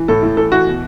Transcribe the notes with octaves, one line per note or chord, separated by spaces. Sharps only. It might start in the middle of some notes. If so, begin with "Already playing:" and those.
Already playing: E3
A2 A4
A2
E3 A4
E3 F#4
B2